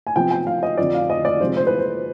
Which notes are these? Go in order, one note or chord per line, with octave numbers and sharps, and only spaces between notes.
G#5
C3 F3 B3 G5
G5
F5
D#5
F2 D3 F3 D5
F5
D#5
D5
C3 F3 G#3 C5
C5
B4
C5